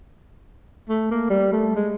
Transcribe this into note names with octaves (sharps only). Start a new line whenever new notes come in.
A3
A#3
G3
A3
G#3